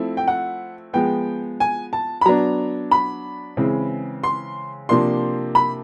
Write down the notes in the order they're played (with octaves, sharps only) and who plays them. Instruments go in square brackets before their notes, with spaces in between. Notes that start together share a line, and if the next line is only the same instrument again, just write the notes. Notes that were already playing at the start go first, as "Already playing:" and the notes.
Already playing: [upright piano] F3 A3 C4 E4
G5
F#5
F3 G#3 B3 G5
G#5
A5
B5
F#3 B3 D4 A#5
B5
C#3 E3 G#3 C4
C6
C3 F3 A#3 D4 C6
B5